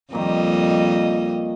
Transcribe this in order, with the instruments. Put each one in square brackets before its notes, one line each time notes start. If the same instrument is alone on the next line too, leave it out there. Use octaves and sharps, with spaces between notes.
[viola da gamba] F2 G3 D#5 [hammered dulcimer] A#2 D#3